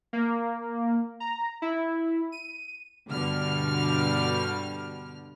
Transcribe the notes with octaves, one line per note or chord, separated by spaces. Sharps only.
A#3
A#5
E4
D#7
G2 B2 D3 G3 F6